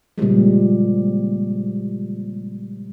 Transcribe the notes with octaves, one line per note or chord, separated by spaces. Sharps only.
A#2 C#3 F3 G3 G#3